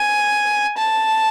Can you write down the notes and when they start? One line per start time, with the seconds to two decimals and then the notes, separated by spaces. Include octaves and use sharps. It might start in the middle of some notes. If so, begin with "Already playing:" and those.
Already playing: G#5
0.77 A5